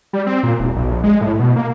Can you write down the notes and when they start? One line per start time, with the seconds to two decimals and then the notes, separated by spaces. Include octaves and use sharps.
0.13 G3
0.27 C4
0.43 A#2
0.60 E1
0.76 B1
0.91 A#1
1.04 G#3
1.21 A2
1.39 B2
1.56 A#3